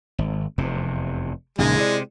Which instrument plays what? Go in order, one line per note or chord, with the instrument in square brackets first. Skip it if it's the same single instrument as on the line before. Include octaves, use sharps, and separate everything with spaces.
[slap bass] G#1
F1 E2 C3
[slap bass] A#1 F#2 [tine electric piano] A#2 C#3 D#4 [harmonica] G#3 G#4
[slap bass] C3 [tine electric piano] E4 D5